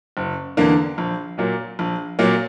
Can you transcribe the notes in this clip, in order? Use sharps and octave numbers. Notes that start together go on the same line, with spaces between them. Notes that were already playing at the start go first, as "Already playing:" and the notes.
F#1
E2 D3 A#3
A#1
A#2 F#3 A#3
A#1
A#2 F#3 A#3